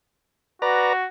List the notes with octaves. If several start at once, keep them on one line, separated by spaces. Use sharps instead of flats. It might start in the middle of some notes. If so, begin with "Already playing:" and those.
F#4 B4 D5 A#5